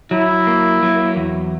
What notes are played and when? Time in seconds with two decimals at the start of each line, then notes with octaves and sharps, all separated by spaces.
0.11 F#3 E4
0.47 A#3
0.83 F#3
1.16 E2